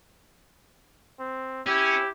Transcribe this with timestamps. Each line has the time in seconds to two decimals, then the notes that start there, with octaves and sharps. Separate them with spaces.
1.20 C4
1.67 C#4 E4 G4